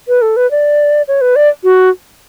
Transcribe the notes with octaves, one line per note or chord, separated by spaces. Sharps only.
B4
A4
B4
D5
C#5
B4
D5
F#4